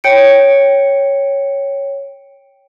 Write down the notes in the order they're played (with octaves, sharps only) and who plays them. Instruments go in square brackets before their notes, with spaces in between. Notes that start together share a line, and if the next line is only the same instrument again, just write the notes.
[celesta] C#5 G5 C#7 D7